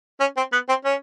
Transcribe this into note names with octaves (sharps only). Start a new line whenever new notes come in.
C#4
C4
B3
C4
C#4